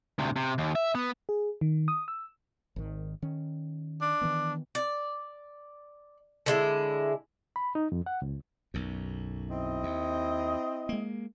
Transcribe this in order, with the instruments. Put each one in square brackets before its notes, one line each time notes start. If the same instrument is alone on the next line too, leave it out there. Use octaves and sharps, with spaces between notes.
[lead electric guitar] D2 C3
C3
D#2
E5
B3
[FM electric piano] G#4
D#3
D#6
E6
[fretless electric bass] G#1 D#3
D#3 C#4
[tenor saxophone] D4
[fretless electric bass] D#3 E3 B3
[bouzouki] D5
D3 G#3 E4
[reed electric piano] B5
D#4
F2
F#5
C#2
[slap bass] B1 F#2
[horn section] C4 E4 D#5
[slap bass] D#2
G#3 A#3